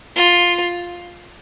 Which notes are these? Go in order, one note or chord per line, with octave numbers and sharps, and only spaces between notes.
F4